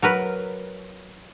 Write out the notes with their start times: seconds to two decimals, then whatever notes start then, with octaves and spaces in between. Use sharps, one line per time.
0.02 F#3 A#4 B4